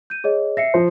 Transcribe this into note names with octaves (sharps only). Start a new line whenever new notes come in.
G6 D#7
G#4 C#5 D#5
E5 A#6 C7 C#7
F3 C5